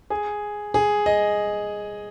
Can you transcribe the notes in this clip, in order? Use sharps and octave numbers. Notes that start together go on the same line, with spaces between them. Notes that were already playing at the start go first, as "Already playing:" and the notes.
G#4
G#4
D#5